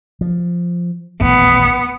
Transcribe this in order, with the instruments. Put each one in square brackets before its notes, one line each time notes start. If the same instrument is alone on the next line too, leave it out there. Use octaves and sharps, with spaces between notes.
[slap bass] F3
[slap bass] D#1 A1 E2 [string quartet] B3